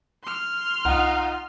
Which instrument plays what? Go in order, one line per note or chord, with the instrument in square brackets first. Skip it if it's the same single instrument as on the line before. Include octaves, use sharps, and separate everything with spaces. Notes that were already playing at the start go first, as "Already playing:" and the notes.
[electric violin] C6 F6
[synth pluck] C2 [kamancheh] D#4 F4 [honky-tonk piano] F#5